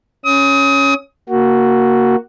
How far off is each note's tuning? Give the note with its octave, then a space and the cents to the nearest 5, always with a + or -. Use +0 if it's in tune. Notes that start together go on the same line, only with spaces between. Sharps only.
C#4 +0 D#6 +30
A#3 +0 F#4 +5